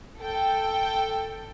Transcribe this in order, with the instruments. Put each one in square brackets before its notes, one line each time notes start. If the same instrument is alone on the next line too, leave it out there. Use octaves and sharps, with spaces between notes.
[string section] A4 G5